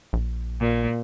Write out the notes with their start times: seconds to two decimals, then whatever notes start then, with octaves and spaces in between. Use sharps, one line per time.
0.13 A#1
0.60 A#2